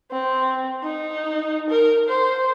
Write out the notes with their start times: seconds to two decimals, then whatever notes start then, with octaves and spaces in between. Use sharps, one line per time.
0.12 C4
0.83 D#4
1.70 A#4
2.09 C5